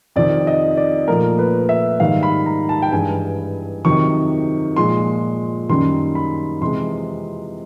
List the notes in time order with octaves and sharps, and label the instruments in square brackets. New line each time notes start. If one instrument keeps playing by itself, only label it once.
[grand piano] F2 C3 D#3 D5
D#5
D5
A#2 F3 A3 A#4
B4
E5
G#2 D#3 G3 F5
B5
A#5
A5
G5
G2 E3 G#3 G#5
F2 C3 D#3 F#3 C#6
A#2 F3 G#3 C6
F#2 D#3 G3 C6
B5
F2 C3 E3 G#3 C6